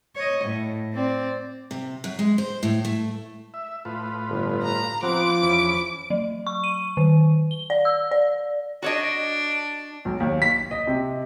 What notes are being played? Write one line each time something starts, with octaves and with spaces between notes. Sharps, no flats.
C#5 D#5
A2
C4 D5
C3
F#2
G#3
C5
A2
A3
E5
A2 F4 B4
G1
A#5
F3 B3 C4 F#5 D6 D7
E2 C#4 B5
F#3
C#6
D#7
D#3
G7
D5
E6
D5
D4 F#4 C#5 D#5
B1
D#2
B6
D#5
C3